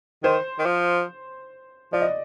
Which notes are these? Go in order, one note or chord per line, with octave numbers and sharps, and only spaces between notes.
D#3 C5
D#3
F3
F3 D5
D#5